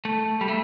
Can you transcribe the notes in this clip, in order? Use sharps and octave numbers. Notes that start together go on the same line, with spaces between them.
A3
G3
A3